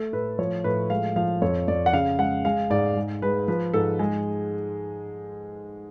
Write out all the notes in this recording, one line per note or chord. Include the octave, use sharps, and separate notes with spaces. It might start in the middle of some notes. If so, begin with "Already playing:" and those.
Already playing: A3 A4
A2 B4
F3 C#5
A2 B4
G#3 F5
F3 F5
F2 C#5
F2 D5
F#5
C#3 F5
G#3 F#5
G#3 F5
G#2 D5
G#3
G#3 B4
F3 B4
G#2 A4
G#3 G#4